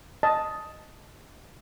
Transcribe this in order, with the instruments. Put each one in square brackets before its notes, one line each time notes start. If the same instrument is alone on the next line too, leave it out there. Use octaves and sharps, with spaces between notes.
[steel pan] D#5 A5